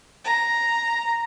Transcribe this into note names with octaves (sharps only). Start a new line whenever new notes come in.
A#5